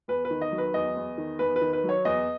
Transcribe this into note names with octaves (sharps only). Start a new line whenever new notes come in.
E2 B4
B4
D#3
D#5
F#3
B4
E2 D#5
E2
D#3
E2 B4
B4
D#3
B4
F#3
C#5
E2 D#5